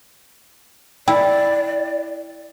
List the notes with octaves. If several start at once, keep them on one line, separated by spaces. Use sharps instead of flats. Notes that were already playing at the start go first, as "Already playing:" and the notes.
E4 D5 G5